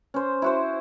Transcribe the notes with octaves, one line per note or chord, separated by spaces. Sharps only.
C#4 C5
E4 F#4 C5